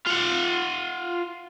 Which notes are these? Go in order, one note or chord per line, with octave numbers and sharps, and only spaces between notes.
F4 F#5